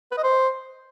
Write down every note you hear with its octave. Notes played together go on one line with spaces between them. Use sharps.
B4
D#5
C5